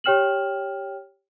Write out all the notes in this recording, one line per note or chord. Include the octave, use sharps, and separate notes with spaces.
G4 C#5 G5 F6 E7 F#7